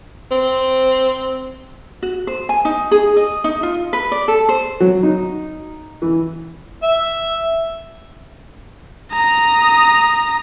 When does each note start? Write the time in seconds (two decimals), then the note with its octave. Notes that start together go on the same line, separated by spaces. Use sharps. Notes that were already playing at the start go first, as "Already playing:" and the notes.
0.31 C4
2.02 F#4
2.27 C5
2.49 G#5
2.65 D#4
2.91 G#4
3.16 D#5
3.44 D#4
3.63 F4
3.93 B4
4.12 D5
4.28 A4
4.49 C5
4.80 F#3
5.03 D#4
6.02 E3
6.83 E5
9.12 A#5 D#6